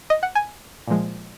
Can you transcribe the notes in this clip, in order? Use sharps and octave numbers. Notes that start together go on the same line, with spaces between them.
D#5
F#5
G#5
A#2 F3 G#3